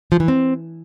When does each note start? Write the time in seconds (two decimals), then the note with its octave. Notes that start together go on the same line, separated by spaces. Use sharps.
0.12 F3
0.20 E3
0.28 C4